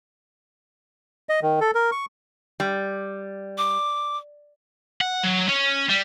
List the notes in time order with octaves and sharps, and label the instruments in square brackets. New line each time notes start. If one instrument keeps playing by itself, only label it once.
[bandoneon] D#5
D#3
A4
A#4
C#6
[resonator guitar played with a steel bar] G3
[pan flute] D6
[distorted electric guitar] F#5
F#3
C#4
G3